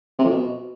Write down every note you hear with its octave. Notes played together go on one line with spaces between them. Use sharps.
C3
F2
B2